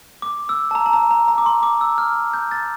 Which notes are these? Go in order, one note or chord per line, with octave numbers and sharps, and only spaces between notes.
D6
E6
A5
A#5
A5
A#5
A#5
A#5
D6
C6
D6
E6
F6
G6
A6